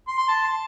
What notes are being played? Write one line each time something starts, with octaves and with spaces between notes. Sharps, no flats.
C6
C6
A5